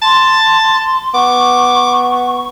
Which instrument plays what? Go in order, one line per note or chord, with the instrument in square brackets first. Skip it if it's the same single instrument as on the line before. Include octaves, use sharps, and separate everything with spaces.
[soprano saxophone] A5 [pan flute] C6
[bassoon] B3 [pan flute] C#6 [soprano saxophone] D6